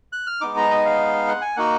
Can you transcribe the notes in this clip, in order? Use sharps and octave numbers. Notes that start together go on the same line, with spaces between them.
F#6
F6
G#3 B3 D#4 D6
A#5
D#5
F5
F#5
G#5
A#3 D#4 F#4 F#5